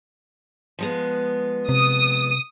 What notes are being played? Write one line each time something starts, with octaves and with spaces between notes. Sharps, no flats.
F3 G#3 B3
C3 D#6